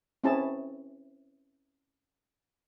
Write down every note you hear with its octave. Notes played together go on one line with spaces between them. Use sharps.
C4 C#4 E4 G#4 A5